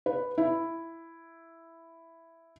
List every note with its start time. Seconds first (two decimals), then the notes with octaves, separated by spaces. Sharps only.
0.06 B4
0.38 E4